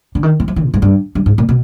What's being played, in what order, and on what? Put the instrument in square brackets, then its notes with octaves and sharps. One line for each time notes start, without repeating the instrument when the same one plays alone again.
[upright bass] D3
D#3
E3
F3
E3
A#2
G#2
G2
G2
G#2
A#2
B2